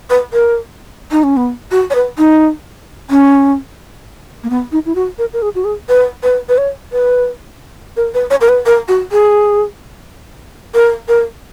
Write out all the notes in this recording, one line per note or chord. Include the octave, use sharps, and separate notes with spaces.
B4
A#4
D#4
C#4
B3
F#4
C#5
B4
D#4
C#4
A#3
B3
D#4
E4
F#4
A#4
A#4
G#4
F#4
G#4
B4
B4
B4
C#5
B4
A#4
B4
C#5
A#4
B4
A#4
F#4
G#4
A#4
A#4